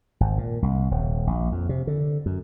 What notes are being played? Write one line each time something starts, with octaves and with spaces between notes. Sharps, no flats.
G#1
A#2
C2
D#1
A#1
F2
C3
D3
F#2